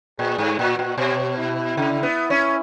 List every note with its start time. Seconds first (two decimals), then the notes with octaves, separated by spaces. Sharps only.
0.19 A#2 G#4
0.38 G#2
0.59 A#2 F#4
0.79 A#2
0.98 B2 C#5
1.37 E4
1.77 C#3
2.03 B3
2.30 C#4